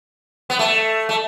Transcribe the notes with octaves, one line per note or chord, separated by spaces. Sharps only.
B3
A3
A3